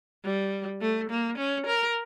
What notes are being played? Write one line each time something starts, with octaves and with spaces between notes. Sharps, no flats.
G3
A3
A#3
C#4
A#4